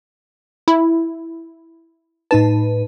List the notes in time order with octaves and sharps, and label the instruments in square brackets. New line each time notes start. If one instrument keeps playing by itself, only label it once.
[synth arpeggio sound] E4
[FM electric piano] A2 D#4 B4 [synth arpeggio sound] A5